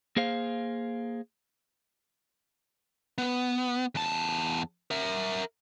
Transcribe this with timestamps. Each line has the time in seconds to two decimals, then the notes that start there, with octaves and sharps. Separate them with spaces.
0.17 A#3 G#4 C5 F5
3.18 B3
3.95 E2 A5
4.91 A#4 E5